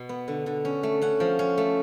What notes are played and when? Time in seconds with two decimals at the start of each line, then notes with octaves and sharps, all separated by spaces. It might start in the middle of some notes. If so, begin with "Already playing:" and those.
Already playing: B2
0.09 B3
0.28 D3
0.46 D3
0.65 C#4
0.83 A3
1.02 C#4 F#5
1.20 F3
1.39 C#4
1.57 A3